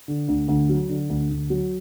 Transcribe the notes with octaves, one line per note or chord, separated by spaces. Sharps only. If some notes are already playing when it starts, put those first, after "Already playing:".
D3
D2
D2
F#3
D3
D2
D2
F#3